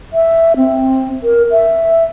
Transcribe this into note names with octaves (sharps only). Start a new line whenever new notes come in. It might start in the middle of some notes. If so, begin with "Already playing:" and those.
E5
C4
A#4
E5